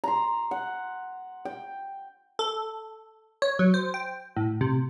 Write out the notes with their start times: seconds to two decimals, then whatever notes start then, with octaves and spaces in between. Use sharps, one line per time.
0.04 A#5 C6
0.51 F#5
1.45 G5
2.39 A4
3.42 C#5
3.59 F#3
3.74 C5
3.94 G5
4.36 A2
4.61 C3